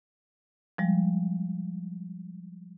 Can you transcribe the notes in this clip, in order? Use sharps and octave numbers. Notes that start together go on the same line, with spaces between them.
F3 G3 G#3